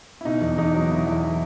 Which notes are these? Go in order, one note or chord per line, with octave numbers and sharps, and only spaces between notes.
E4
B2 D#4
E2
E2 D#4
F#3
B2 E4
E2
E4